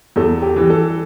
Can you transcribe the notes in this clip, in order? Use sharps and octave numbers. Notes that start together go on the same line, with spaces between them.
E2 A4
G4
E3 G3
A4